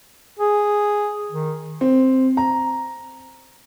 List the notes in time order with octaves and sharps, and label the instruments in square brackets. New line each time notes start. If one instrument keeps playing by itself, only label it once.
[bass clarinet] G#4
D#3
[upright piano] C4
A#5